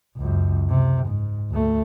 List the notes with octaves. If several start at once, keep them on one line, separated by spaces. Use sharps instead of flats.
C#2 F#2
C3
G#2
D2 A3